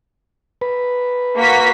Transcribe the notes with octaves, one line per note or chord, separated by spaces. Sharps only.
B4
A#3 F#4 B6